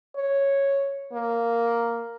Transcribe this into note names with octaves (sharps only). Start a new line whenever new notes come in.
C#5
A#3